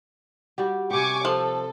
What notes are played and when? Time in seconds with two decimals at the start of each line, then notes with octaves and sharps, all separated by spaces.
0.58 G3 F#4 G4
0.91 C3 G4 G#5 C#6 D6
1.25 F3 A4